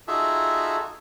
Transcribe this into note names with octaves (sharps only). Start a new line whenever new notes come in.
D#4 F4 F#4 G#4 A4 E5